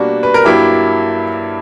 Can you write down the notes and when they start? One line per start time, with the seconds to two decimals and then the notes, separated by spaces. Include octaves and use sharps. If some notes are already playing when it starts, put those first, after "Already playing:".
Already playing: B2 G3 A#3 D4 F#4
0.23 B4
0.34 A#4
0.45 G2 F#3 A#3 E4 G4